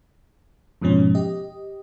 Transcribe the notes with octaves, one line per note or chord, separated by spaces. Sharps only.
F2 G#2 B2 F3 C#4
G4 D#5